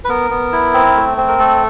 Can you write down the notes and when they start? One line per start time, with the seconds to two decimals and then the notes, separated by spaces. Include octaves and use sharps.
0.04 B4
0.09 B3 A#4
0.30 B3
0.53 E4
0.74 C4
0.95 A3
1.17 C4
1.28 A#4
1.39 A3 A4